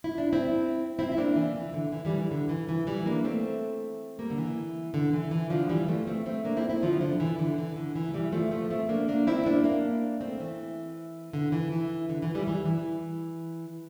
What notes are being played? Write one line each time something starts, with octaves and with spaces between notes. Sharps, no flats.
E4
D4
C4 E4
C4 E4
E4
A#3 D4
E3
E3
D3
E3
E3 G3
E3
D3
E3
E3
E3 G3
A#3 D4
A3 C4
G3 A#3
D3
E3
D3
E3
E3
D3 F3
E3 G3
F3 A3
A3 C4
A3 C4
A#3 D4
C4 E4
C4 E4
D3 F3
D3
E3
D3
E3
D3
E3
A3
E3 G3
F3 A3
F3 A3
A3 C4
A#3 D4
A#3 D4
C4 E4
A#3 D4
A#3 D4
A3 C4
E3
D3
E3
E3
D3
E3
E3 G3
E3 G3
E3